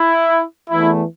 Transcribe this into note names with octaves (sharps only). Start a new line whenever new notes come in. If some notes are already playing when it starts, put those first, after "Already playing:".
Already playing: E4
E2 E3 A3 E4